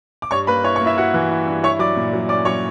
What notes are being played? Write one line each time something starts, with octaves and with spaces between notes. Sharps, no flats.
D6
G2 C#5 C#6
A#3 B4 B5
E4 C#5 C#6
C#5 C#6
A#3
E4 E5
E4 F#4 F#5
E3
E4
G2
E4 C#5 C#6
F#3 D5 D6
A#2
F#3
C#4 D5 D6
F#3 C#5 C#6